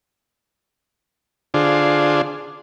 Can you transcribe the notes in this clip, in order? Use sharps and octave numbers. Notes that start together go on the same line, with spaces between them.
D3 D4 F4 G#4 C5